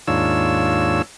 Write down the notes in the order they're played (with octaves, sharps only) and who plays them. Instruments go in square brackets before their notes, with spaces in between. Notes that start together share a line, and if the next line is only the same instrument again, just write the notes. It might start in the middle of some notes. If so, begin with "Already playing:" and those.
[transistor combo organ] D#2 G#2 D4 F4 C#5 E6